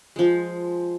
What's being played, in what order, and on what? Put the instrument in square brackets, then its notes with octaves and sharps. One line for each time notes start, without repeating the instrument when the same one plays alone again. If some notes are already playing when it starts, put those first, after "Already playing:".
[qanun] F3 G#3